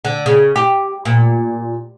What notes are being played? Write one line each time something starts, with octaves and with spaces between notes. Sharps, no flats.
D3
C#3
G4
A#2